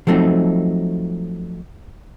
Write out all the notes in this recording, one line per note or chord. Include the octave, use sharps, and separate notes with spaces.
F3 F#3 A3 C4 D#4